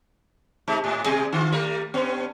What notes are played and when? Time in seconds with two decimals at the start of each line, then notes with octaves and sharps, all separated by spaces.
0.68 C3 G#3 D#4
0.84 G#2
1.04 B2 G3 G#4
1.32 D3 F4
1.52 G3 A3 A#4
1.94 G2 B3 C#4